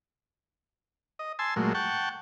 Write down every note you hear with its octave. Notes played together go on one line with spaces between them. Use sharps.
D#5
G#5 A5 C6 E6
A#2 F#3 G#3 A3
F#5 G5 A5 C#6